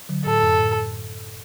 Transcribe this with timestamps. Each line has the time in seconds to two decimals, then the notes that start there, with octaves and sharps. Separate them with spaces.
0.09 D3 F#3
0.25 A2 A4
0.42 F#2
0.58 A2